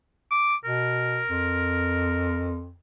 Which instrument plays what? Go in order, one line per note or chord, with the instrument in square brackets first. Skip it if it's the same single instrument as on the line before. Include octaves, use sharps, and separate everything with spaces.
[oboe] D6
[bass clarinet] B2 [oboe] A#4
[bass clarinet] F2